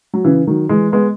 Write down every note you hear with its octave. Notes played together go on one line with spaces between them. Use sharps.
F#3
C#3 E3
D#3 F#3
E3 G#3
G#3 B3